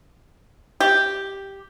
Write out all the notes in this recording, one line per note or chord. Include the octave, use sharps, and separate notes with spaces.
G4